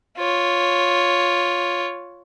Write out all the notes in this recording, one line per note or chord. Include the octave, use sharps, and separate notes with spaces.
F4 C#5